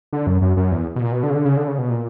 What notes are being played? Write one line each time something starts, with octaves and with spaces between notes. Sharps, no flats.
D3
F#2
F#2
F#2
E2
B2
A#2
B2
D3
C#3
D3
C#3
D3
C#3
B2
A#2